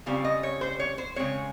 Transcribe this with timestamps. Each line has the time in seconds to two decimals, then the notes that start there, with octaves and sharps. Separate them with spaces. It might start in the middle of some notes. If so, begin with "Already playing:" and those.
0.06 C#3 G3 C4 F4
0.24 D#5
0.43 C#5
0.61 C5
0.80 C#5
0.98 C5
1.16 C#3 G#3 C4 C#5